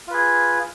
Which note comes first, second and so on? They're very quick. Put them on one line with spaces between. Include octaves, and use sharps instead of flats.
F4 B4 G#4